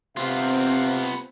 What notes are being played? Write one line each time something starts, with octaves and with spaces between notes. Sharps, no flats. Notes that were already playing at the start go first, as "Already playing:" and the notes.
C3 B3 C4 F4 F5